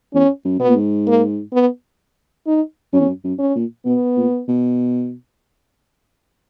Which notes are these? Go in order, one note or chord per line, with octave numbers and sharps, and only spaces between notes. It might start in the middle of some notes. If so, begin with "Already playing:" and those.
E2 C#4
F#2
B2 B3
A#2
G#2
A#3
B3
D#4
F#2 C#4
E2
F#2
F#2
C#4
A#2
B2 B3
A#2
B2